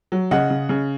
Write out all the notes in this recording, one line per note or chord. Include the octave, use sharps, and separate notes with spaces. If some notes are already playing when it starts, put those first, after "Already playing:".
F#3
C#3 D#5 F#5
C#3
C#3